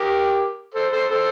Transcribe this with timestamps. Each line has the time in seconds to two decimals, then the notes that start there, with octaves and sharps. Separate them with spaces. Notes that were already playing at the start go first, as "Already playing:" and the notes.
Already playing: G4 A#4
0.74 A4 C5
0.92 A4 C5
1.09 A4 C5